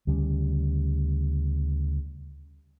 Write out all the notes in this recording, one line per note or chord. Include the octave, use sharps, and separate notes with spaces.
D2 C#3 G3